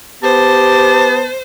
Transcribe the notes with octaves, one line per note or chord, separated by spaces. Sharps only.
B3 G4 C5 A5